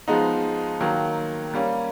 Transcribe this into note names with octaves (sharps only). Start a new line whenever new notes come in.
F3 G#3 B3 D#4
D#3 F#3 A#3
G3 A#3 C#4